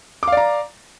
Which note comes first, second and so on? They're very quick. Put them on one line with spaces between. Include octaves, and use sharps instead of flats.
D6 F5 D5 A#5